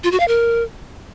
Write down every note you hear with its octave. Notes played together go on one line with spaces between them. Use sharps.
F4
F#4
F5
A#4